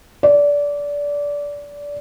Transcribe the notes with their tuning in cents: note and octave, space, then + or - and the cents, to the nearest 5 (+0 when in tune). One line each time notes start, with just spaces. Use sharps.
D5 -20